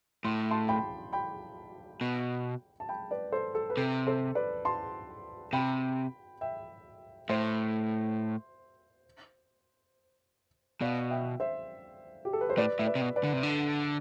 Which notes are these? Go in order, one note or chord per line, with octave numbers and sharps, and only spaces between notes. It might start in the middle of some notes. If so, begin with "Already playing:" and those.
A2 C6
A5 C6
G5 B5
G5 B5
B2
A5
G5 B5
B4 D5
A4 C5
A4
B4
C3 A4
A4 C5
B4 D5
A5 C6
C3 G5 B5
E5 G5
A2 C5 E5
B2 D5 F5
E5 G5
C5 E5
G4
A4
B4
C5
A2 B4 D5
A2 E5
B4 D5
C3
B2
B4 D5
D3
C3
D3